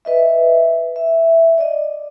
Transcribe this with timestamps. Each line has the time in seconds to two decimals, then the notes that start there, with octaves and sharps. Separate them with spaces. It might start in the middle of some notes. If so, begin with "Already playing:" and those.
0.05 B4 D#5 E5
0.96 E5
1.58 D5 D#5